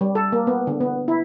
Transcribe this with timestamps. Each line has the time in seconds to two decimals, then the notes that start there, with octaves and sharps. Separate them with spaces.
0.01 G3
0.15 A4
0.32 A#3
0.47 B3
0.67 D3
0.81 B3
1.08 E4